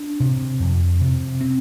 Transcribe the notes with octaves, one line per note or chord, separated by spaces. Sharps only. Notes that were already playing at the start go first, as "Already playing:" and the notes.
Already playing: D4
C3
F2
C3
C4